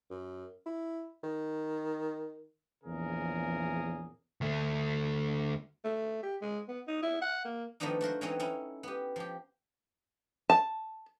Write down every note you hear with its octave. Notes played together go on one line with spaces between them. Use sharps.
F#2
E4
D#3
A#1 E2 C#3 G#4 A#4
D2 A3
A3
G4
G#3
B3
D#4
E4
F#5
A#3
D#3 F3 A3 B3 D4 D#4
A3 F#4 A#4 C5
E3 F#3 C4 C#4 D#4 C#5
C#4 D#4 E4
B3 G4
F3 G4
A5